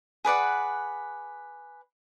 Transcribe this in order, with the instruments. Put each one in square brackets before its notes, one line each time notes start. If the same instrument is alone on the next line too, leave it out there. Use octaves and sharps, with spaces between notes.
[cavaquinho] G#4 B4 D5 F#5